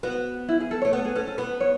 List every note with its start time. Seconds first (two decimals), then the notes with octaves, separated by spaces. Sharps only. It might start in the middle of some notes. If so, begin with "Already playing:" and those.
0.03 B3 F#4
0.49 E4
0.60 G#4
0.71 A4
0.82 C#5
0.85 A3
0.93 B3
0.98 A4
1.05 G#4
1.15 C#4 A4
1.27 A4
1.38 B3 B4
1.60 C#5